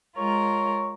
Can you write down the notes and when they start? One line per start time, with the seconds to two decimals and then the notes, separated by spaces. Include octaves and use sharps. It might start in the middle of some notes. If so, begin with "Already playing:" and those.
0.17 G#3 F4 A#4 C#5